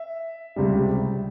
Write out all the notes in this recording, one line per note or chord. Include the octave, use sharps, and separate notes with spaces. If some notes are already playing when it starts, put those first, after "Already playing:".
Already playing: E5
C#2 C3 G3